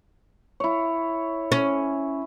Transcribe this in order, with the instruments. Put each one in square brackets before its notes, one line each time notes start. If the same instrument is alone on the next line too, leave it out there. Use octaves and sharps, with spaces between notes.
[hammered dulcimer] E4 C#5
[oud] C#4